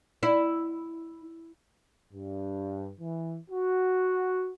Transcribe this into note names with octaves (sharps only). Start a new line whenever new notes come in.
E4
G2
E3
F#4